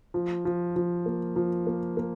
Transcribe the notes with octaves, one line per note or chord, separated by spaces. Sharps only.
F3
F3
F3
A#3
F3
A#3
A#3